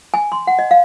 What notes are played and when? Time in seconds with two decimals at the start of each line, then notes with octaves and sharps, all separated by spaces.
0.14 G#5
0.32 C6
0.47 F#5
0.59 D#5
0.71 F5